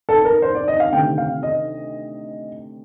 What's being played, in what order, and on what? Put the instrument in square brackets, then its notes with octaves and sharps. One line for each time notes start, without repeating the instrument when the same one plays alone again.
[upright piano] A4
A#4
C5
D5
D#5
F5
D2 C3 D#3 G5
F5
D#5